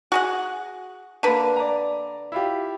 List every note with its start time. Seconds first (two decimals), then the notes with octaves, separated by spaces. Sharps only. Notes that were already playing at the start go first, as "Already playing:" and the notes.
0.12 F#4 G#4 F#5
1.23 D3 A#3 B4 A#5 D#7
1.56 D5 A#5
2.32 E4 F4 G4